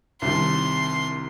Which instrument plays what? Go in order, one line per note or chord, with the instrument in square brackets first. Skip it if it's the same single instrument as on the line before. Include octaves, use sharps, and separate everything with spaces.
[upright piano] C2 C3 D#3 [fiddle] C6